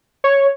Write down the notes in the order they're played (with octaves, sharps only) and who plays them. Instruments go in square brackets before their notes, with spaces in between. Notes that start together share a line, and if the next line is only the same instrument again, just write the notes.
[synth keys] C#5